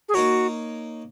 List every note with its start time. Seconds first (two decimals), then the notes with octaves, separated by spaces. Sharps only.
0.09 G#4
0.14 A#3 D#4 F#4 A#4 C#5